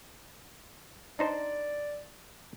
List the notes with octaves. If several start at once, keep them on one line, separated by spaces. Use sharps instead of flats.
D4 D#4 C5 D5